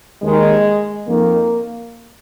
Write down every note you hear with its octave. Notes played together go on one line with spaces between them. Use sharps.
D#2 D#3 G#3
F2 D#3 A#3